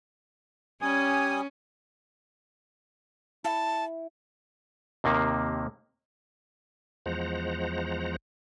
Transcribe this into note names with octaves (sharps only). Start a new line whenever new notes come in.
G3 C#4 G#5 D#6 G#6
E4 A5
D#2 C3 D#3 A#3
E2 F3 G#3 C5 F#5 A#5